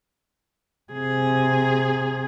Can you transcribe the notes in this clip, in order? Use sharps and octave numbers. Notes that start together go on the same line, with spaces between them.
C3 G#4